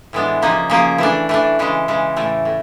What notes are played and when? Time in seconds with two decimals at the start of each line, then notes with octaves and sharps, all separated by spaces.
0.13 A2 E3 G#3 B3 D4
0.42 C#3 F3 A#3 D#4 G#4
0.70 C#3 F3 A#3 D#4 G#4
0.98 E3 A3 D4
1.29 E3 A3 D4
1.59 C#3 E3 G#3
1.88 C#3 E3 G#3
2.16 A2 E3 A3
2.45 A2